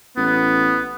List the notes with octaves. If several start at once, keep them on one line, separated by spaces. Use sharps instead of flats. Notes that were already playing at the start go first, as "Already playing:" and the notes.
A1 B3